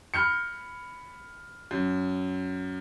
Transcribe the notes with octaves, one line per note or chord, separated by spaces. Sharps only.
B5 F6 G6 C#7
F#2